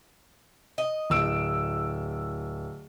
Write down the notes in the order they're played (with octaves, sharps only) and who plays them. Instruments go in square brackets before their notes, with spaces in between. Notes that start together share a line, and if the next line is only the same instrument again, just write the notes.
[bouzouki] D#5
[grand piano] D1 E6 D7